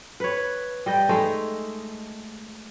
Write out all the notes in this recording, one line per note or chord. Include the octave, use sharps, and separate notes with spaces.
B4 C#5
G3 D#5 G5
G#3 A3 D#4 D#5